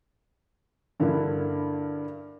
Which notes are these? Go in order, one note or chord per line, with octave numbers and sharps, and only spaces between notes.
G2 D3 A#3 E4